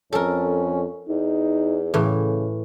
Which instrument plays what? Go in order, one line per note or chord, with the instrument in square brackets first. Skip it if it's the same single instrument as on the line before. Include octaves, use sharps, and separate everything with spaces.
[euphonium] F2 [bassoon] C#4 [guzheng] A4 A#4
[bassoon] E2 [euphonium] D#4
[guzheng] A2 E3 [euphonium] C#3